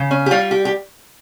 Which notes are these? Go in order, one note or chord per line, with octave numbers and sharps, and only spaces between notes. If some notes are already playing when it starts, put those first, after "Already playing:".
Already playing: C#3
C#4
G4
G3 F4
G4
G4